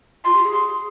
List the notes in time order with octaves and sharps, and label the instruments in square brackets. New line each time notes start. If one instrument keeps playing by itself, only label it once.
[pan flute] F4 [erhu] C6
[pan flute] G4
G#4
[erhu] C6